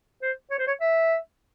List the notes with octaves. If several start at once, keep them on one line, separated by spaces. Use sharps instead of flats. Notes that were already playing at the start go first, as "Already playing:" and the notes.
C5
C#5
C5
C#5
E5